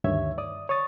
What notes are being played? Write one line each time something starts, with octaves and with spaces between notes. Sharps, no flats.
D2 G2 D#3 C#5 E5 G#6
D5 D#6
C#5 C#6 D#6 A6